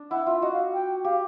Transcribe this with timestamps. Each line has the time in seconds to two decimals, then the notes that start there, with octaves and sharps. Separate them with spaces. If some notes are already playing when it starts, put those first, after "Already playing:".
Already playing: D4
0.11 E4 F#5
0.26 F4 E5
0.42 F#4 D#5
0.53 F5
0.74 G5
1.04 G4 F5